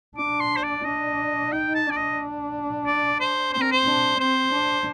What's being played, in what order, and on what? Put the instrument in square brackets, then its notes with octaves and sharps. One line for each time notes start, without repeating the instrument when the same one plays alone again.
[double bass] D4 [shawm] D6
[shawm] C6
C5
D5
[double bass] D4 [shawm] D#5
[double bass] D#4 [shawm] G5
[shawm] A5
[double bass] D4 [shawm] D5
[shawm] D#5
D5
C5
[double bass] C4 [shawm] C5
[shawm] A#4
C5
[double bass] D4
[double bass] C4 [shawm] C5
[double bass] D4